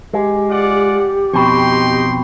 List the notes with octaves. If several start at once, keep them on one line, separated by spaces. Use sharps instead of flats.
G#3 G4
F4 D5 F#5
F2 B2 C4 D#4 G5 C6